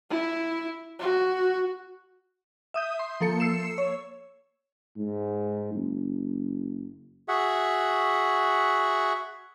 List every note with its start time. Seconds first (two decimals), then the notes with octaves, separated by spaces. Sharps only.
0.10 E4
0.99 F#4
2.74 E5 D#6 G6
2.99 C6
3.21 F3 A#3 A4 C#7
3.40 E6 C7 C#7 E7
3.78 C#5
4.97 G#2
5.74 F#1
7.28 F#4 G#4 E5 F#5